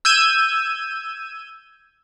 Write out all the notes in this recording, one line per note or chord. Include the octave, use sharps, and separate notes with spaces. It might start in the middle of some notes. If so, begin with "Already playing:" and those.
E6 G6 G#6 D#7